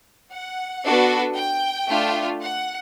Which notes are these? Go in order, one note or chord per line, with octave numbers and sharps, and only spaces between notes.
F#5
B3 D4 F#4 A4
G5
A3 D4 F4
F#5